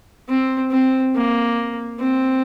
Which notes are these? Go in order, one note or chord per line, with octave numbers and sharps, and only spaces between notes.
C4
C4
A#3
C4